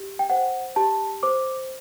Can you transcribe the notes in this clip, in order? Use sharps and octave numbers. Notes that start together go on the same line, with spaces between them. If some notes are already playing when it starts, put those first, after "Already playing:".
Already playing: G4
G5
C5 F#5
G4 A5
C5 D6